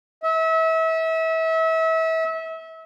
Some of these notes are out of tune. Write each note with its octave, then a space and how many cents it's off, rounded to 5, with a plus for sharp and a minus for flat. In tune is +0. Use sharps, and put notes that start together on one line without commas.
E5 -30